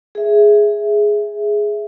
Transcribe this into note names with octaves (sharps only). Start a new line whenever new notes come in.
G#4 E5